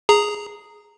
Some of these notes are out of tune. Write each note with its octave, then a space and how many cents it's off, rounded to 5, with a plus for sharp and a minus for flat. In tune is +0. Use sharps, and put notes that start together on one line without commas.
G#4 +0 A#5 -10